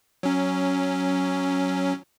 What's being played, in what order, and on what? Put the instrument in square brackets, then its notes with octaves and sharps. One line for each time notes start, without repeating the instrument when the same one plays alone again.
[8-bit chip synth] F#3 C#4